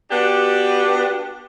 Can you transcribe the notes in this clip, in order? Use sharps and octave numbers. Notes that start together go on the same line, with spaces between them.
B3 D4 F#4 G4